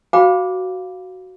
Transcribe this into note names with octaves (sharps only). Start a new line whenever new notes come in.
F#4 C5 F5 G5 B5 D6